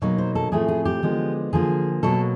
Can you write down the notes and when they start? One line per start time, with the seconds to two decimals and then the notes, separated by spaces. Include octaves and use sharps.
0.02 B2 F#3 A#3 D#4
0.18 C5
0.35 A4
0.52 A2 F3 A3 C4 G#4
0.68 G#4
0.85 G4
1.03 D3 F3 G#3 B3
1.53 D3 F3 A#3 G#4
2.03 B2 F#3 A#3 A4